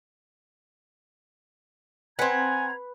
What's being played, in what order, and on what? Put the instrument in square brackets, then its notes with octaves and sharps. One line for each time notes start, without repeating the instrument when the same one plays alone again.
[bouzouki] C4 F#5 [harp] B4 [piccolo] G#5 [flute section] A#5 G#6